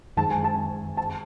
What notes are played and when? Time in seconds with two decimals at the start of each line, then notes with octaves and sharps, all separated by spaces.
0.17 F#2 D#3 G#3 A5
0.31 G#5
0.44 A5
0.97 A5